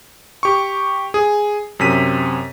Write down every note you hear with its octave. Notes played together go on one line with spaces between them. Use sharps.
G4 C#6
G#4
F#2 C3 B6 D#7